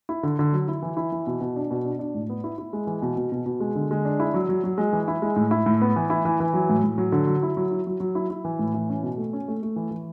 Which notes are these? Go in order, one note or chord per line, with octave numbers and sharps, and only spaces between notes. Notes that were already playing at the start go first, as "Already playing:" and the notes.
E4
D3
D3
F#3
E4
E3
E4
E3
B2
B2
D4
B2
D4
D4
A2
B3
E4
E4
G#3
E3
B2
B2
B2
B2
G#3
D3
G#3
D4
E4
F#3
F#3
F#3
G#3
E3
E4
G#3
A2
E4
A2
B3
E3
E4
E3
E3
F#3
A2
A2
F#3
D3
F#3
E4
F#3
E4
F#3
F#3
E4
E4
E3
A2
E3
C#4
B2
A3
C#4
A3
A3
E3
E3